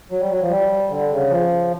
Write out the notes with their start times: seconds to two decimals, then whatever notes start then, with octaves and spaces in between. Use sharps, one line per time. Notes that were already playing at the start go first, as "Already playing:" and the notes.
0.11 F#3
0.20 G3
0.30 F#3
0.41 F3
0.50 G3
0.90 D3
1.12 C#3
1.30 F3